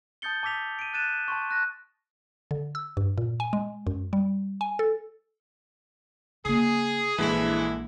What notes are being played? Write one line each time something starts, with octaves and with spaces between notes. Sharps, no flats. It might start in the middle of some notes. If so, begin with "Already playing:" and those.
A5 D#6 G6 A6 C#7 G7
A5 D6 E6 B6 F7
D7 D#7
F#6 A6 D#7 E7
A5 C6 C#6
F#6 A#6
D3
E6
G2
A#2
G#5
G#3
F#2
G3
G#5
A4
C#3 A#3 G#4
A#1 D3 E3 G#3 E4